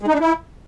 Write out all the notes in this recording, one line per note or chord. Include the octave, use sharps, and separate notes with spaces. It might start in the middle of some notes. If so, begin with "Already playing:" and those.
G#3
D#4
D4
E4